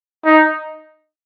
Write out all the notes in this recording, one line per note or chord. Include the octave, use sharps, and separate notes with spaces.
D#4